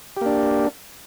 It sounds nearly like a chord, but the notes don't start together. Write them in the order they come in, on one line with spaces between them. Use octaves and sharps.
G4 A#3 D4